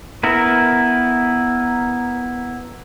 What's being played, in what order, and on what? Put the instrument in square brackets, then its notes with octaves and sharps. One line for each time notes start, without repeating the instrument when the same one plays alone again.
[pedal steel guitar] B3 E4 A#4